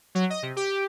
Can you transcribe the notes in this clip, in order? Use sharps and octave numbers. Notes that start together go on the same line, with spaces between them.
F#3
D#5
C3
G4